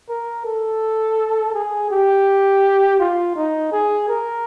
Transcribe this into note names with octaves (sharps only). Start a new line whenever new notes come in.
A#4
A4
G#4
G4
F4
D#4
G#4
A#4